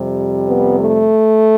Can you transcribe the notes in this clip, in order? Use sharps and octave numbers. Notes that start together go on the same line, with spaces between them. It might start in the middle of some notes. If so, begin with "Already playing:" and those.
Already playing: F2 C3 G3
B3
A3